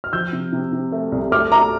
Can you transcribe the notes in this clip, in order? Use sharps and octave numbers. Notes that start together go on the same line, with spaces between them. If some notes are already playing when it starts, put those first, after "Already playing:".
F6
F3 E6 G6
C3
C3
C3
A3
C2
A3 D6 F6
A3 A#5 D6